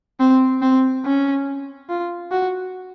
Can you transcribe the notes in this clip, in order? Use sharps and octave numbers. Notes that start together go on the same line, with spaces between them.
C4
C4
C#4
F4
F#4